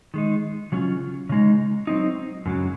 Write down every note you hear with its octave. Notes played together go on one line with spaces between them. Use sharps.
D#3 G#3 D#4
C#3 F#3 C#4 F4
C#3 G#3 D#4
F#3 C4 D#4
F#2 C#3 F#3